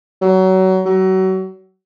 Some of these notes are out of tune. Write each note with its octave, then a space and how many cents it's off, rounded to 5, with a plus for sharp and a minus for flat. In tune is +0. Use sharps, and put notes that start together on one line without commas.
F#3 +25
F#3 +30